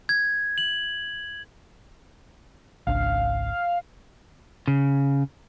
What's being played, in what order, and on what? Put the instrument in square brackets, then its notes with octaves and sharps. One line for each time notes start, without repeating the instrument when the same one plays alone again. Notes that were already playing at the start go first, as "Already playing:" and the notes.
[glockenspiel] G#6
F#7
[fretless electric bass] G#1 C#2 D4 [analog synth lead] F5
[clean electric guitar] C#3